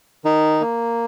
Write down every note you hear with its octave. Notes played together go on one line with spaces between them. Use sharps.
D#3 D#4
A#3